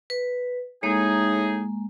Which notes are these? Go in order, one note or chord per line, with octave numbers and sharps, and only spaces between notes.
B4
A2 G#3 A#3 D#4 G#4